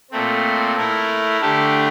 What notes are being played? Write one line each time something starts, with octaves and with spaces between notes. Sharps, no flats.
A#2 A3 C4
A3 E4 A#4
D3 A3 D4 G4